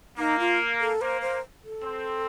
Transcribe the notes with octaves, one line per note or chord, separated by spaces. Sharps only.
A#3 D#4
F4
A4
A#3 C5
C5
A4
C4